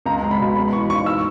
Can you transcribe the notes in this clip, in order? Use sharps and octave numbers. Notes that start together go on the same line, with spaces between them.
C#2 A#5
G#3
B5
B2
G#3 B5
E3 C#6
G#2 C#6
E6